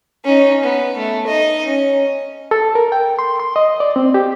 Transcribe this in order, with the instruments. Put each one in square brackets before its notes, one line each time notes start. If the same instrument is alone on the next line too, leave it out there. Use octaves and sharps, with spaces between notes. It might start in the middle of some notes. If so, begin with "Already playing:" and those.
[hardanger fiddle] C#4 D#4
B3
A3
D#4 D#5
C#4
[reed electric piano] A4
A#4
G5
C6
C6
D#5
D5
C4
G4